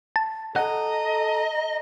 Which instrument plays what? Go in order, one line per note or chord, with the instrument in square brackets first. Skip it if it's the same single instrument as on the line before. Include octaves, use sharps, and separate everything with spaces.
[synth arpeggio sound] A5
[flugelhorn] A4 [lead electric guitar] D#5 [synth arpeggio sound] F#5 [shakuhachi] A#5